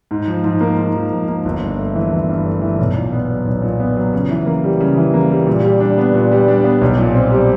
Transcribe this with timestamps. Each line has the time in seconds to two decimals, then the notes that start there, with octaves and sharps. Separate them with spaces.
0.11 G#2
0.28 F3
0.44 G#2
0.61 A#3
0.77 G#2
0.94 F3
1.12 G#2
1.28 A#3
1.45 G1
1.61 G2
1.78 A3
1.96 E3
2.12 G1
2.29 G2
2.46 A3
2.61 E3
2.78 B1
2.96 A#2
3.12 B3
3.30 F#3
3.45 B1
3.62 A#2
3.80 B3
3.96 F#3
4.13 C#3
4.30 E3
4.46 A#3
4.64 G3
4.80 C#3
4.97 E3
5.14 A#3
5.30 G3
5.47 A#2
5.63 G3
5.80 D4
5.98 B3
6.14 A#2
6.32 G3
6.48 D4
6.64 B3
6.81 B1
6.98 A#2
7.15 C4
7.32 G3